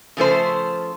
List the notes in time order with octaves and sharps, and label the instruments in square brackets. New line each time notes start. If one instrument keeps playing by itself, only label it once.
[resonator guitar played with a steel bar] C#3 F3 A3 C5